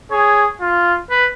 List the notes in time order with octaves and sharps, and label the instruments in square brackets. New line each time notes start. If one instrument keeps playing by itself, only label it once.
[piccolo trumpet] G#4 [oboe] C#5
[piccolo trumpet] F4
[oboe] B4